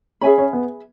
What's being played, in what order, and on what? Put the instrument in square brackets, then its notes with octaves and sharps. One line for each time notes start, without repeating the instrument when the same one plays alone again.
[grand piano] C#4 [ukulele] G#4 E5 G#5 B5
[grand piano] C#4
B3